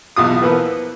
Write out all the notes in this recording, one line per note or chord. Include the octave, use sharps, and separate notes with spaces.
B1 E2 F4 D#6
E3 F3 A#3 B3 B4